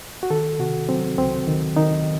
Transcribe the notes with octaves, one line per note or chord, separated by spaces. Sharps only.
F#4
D#3 A4
C3 F#4
F#3 C4
C#2 C4
D#3
D#3 D#4